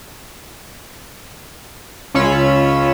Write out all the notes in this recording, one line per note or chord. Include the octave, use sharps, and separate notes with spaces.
C#2 C#4 F4 C#5 B5 E6